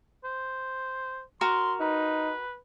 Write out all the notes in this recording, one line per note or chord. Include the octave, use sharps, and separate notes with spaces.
C5
F#4 A#4 C6
D#4 B4